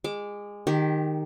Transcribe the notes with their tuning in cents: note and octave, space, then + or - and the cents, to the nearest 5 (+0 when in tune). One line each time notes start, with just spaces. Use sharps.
G#3 -20 D6 +0
D#3 -15 G4 +0